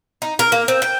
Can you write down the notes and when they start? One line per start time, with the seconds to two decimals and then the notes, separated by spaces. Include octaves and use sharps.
0.22 D#4
0.39 A#4
0.52 A#3
0.68 C4
0.82 G5